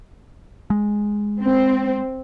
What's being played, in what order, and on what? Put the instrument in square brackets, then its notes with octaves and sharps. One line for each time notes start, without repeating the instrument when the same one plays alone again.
[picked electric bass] G#3
[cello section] C4